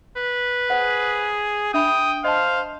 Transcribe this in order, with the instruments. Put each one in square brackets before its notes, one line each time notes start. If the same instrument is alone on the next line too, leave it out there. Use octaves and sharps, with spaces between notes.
[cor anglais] B4
[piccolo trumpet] G#4 [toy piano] C5 F#5
[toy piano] D4 E5 B5 [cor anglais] G5 [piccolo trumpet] D#6
[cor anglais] C5 [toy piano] D#5 A5 [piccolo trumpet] F5